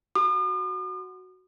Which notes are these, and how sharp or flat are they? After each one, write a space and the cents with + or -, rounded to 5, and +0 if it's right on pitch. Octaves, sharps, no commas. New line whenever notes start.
F#4 +0 D#6 -45